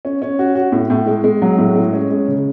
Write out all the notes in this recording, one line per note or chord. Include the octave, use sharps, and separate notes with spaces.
C#4
C#4
F#4
F#4
A2
A2
G#3
G#3
F#3
A2
G#3
C#4
G#3
C#3